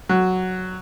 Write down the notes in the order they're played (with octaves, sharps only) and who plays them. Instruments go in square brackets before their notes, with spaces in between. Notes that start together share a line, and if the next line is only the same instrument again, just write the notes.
[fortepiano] F#3